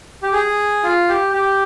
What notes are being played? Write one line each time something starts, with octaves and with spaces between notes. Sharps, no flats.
G4
G#4
F4
G4
G4